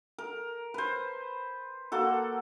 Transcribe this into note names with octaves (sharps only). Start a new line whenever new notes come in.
A#4
B4 C5
A#3 F#4 A4